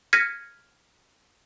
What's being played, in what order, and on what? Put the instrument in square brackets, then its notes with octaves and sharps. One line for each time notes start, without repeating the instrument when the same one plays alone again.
[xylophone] F6 G#6 A#6 B6 C#7 D#7